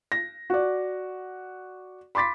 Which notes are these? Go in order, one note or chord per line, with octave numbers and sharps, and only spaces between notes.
A#6
F#4 D5
B5 C6 D6 A6 B6